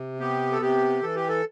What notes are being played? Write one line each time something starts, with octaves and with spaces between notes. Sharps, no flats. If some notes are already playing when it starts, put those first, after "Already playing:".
Already playing: C3
B3 G4
A4
C3 G4
E3 A4
G4
A4